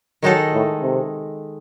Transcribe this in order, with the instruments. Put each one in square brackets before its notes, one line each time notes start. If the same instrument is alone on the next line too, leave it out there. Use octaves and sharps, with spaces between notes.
[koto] D#3 G#3 D#4 A4 [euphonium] F#3
[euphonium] A2
C3